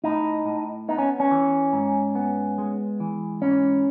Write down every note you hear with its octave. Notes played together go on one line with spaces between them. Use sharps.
A2 D#4
A2
B3 D#4
C#4
C#4
E3
G#2
B3
G#3
E3
G#2 C#4